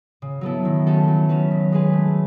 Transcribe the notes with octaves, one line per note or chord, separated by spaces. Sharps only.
C#3
F#3 B3 E4 A4
D#3
A3 C#4 F#4 A4
F#3
C#4 F#4 B4
D#3
G#3 C#4 G#4 B4
A3